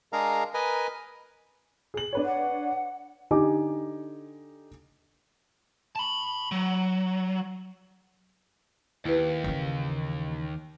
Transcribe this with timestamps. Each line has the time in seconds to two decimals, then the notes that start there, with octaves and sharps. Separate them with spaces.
0.13 G#3 D4 G#4 A#4 F5 A#5
0.54 A#4 B4 D#5 G#5
1.94 G#4 F#7
2.13 D4 B4 C#5
2.25 F#5
3.31 D3 D#4 G4 G#5 D6
5.96 A5 B5
6.52 F#3
9.05 D#2 E4 G4 B4
9.44 C#3 E3